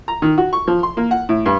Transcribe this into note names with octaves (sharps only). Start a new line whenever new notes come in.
A#5
D#3
F#4
C#6
F3
C6
A#3
F#5
A2
G2